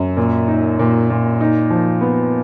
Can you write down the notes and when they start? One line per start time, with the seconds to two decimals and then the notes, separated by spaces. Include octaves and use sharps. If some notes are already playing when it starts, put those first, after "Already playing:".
Already playing: F#2
0.17 A#2
0.48 D#4
0.79 A#2
1.10 A#2
1.41 D#4
1.70 F3
2.01 B3